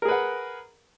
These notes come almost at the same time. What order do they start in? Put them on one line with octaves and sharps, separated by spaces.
A#4 G#4 B4 F#5